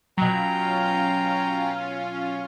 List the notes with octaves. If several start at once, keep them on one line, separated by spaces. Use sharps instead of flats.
B2 F#3 C#4 F4 G5 A#5